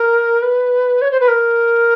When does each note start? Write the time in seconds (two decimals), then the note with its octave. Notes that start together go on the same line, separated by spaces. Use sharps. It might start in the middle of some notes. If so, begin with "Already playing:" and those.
Already playing: A#4
0.42 B4
1.01 C#5
1.11 C5
1.20 B4
1.28 A#4